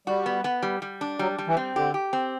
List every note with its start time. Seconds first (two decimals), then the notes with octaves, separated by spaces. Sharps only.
0.07 G3 F#4
0.26 B3
0.44 B3
0.63 G3
0.82 G3
1.01 D4
1.19 F#3 G3
1.39 G3
1.47 E3
1.57 C4
1.76 D3 G4
1.94 G4
2.13 C4